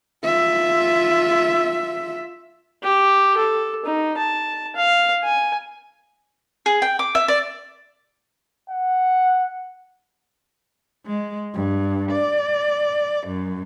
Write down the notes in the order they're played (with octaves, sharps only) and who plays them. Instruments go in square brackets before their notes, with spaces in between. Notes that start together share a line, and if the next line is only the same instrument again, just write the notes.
[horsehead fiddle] F4 E5
[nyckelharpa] G4
A4
D#4
A5
F5
G#5
[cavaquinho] G#4
G5
D6
E5
D5
[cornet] F#5
[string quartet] G#3
G2
D5
F#2